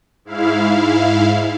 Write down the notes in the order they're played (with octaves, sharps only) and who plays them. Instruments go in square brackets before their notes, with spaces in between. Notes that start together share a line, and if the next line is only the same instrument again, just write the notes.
[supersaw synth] G#2 E4 F5